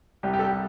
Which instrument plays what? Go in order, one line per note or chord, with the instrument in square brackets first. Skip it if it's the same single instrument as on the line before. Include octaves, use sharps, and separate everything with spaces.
[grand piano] C2 C3 G3 G4
G4
A4
G4